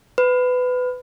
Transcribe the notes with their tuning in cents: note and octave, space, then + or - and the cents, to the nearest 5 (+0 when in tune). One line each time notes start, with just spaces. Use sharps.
B4 +20